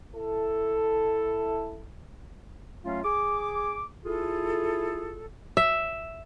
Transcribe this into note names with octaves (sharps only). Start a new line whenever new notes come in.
E4 A4
F#3 A3 C#4 F4 F5
G#4 D6
E4 F4 G#4 A4
E5